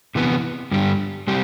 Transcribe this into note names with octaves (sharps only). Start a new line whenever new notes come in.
C3 E3 B3
G2 D3 G3 D4 G4
C3 G3 C4 G4